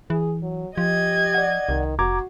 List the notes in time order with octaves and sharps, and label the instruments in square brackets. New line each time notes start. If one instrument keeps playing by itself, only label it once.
[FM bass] E3 [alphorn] G#4
[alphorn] F#3
[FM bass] F3 [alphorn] G4 [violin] D#5 G#6
[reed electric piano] D5 F#5
[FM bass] C2 [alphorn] D#3
[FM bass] F1 [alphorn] F#4 [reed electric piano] A#5 D6 G#6